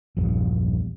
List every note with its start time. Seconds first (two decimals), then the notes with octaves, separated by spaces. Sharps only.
0.17 A#1 E2 G2